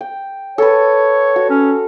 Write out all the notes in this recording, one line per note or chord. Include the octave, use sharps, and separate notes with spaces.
G5
A4 B4 C#5
F#4
C#4